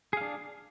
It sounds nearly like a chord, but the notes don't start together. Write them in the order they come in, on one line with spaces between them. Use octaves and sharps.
G#4 F5 D4